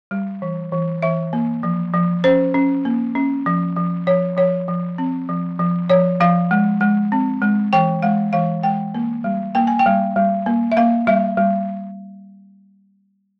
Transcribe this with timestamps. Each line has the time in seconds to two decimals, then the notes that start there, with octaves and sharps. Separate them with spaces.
0.11 G3
0.42 E3
0.72 E3
1.02 E3 E5
1.33 A#3
1.63 F3
1.94 F3
2.24 C#4 C5
2.54 C#4
2.85 A#3
3.15 C#4
3.46 F3
3.76 F3
4.07 F3 C#5
4.37 F3 C#5
4.68 F3
4.98 C4
5.29 F3
5.59 F3
5.89 F3 C#5
6.20 F3 F5
6.51 G#3
6.81 G#3
7.12 C4
7.42 G#3
7.73 E3 G5
8.02 G#3 F5
8.33 E3 F5
8.63 G#3 G5
8.94 A#3
9.24 G3
9.55 A#3 G5
9.67 G#5
9.79 G5
9.86 G3
10.16 G3
10.46 A#3
10.72 E5
10.77 A#3 F5
11.07 G3 E5
11.37 G3